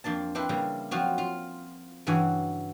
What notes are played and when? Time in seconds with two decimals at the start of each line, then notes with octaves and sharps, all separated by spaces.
0.04 F2 A#3 D4 A5
0.35 C4 D4 E4 B4 C5
0.49 C#3 G3 A#3
0.91 F3 F#3 C4 F4 F#4
1.18 F4
2.07 G2 C#3 E3 F#4 F#5 G#5